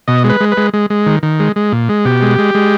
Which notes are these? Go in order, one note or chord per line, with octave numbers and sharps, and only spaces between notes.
B2 D#5
G#3
B4
G#3
B4
G#3
G#3
G#3
D#3
D#3
G#3
G#3
A#2
G#3
B2 G4
G#3
G#3
G#3